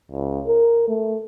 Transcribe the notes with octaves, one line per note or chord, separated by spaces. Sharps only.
C#2
A#4
A3